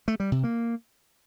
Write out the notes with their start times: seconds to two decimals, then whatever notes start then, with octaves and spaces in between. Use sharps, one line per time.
0.08 A3
0.20 G3
0.32 C3
0.44 A#3